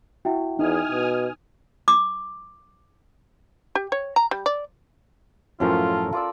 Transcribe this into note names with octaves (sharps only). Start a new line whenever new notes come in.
E4 F#4 E5 G5
E2 D#4 G#5 D#6 F6
B2
D6
G4
C#5
A#5
G3
D5
F#2 A2 F3 C#4 F4 A4 A#4
F4 D5 E6